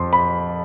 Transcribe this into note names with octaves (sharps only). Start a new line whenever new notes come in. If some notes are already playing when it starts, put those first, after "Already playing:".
Already playing: F2 F3 C6
B5